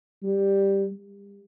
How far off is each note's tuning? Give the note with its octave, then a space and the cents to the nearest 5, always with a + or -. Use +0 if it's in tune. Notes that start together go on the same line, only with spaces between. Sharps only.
G3 +5
G3 +35